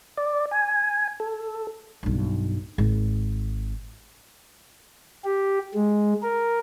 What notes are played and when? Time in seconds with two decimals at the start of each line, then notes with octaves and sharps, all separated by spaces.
0.17 D5
0.51 G#5
1.20 A4
2.03 B1 G2
2.78 G#1
5.25 G4
5.74 G#3
6.23 A#4